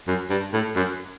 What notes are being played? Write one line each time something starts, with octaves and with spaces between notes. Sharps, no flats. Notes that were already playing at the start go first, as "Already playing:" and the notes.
F#2
G2
A2
F#2